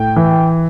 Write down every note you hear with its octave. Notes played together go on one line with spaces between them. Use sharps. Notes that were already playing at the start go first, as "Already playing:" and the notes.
Already playing: A2 G5
E3